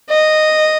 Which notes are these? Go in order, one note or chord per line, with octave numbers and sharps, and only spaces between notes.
D#5